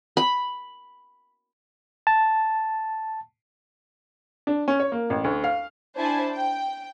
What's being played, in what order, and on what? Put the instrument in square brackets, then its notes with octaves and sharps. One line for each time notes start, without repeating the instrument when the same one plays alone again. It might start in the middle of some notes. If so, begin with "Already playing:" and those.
[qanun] B5
[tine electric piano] A5
[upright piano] D4
C#4
C#5
A#3
A1
D2
F5
[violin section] D4 E4 C5 G#5 A5
G5